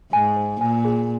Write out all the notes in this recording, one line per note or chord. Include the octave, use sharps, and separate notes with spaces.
G#2 G#5
C5
A#2 G#5
G#4